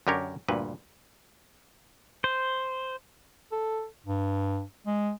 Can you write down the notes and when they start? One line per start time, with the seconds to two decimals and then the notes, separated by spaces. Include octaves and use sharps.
0.07 F#2 D3 G4 A#4 C#5
0.48 D2 G2 A#2 B4
2.24 C5
3.52 A4
4.06 G2
4.86 G#3